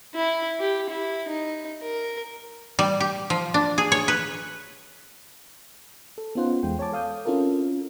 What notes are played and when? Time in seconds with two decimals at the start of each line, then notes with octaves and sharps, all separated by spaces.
0.15 E4
0.60 G4
0.90 E4
1.28 D#4
1.82 A#4
2.79 G3
3.00 G4
3.30 F3
3.54 D4
3.78 G#4
3.92 C#5
4.08 B4
6.18 A4
6.35 B3 C#4 D#4 F4 C5 F#5
6.63 E2 G#3 G5
6.79 C#5 G#5 A5 D6
6.92 A4 F5 D#6 G6
7.25 C4 C#4 E4 F4 A4 A#4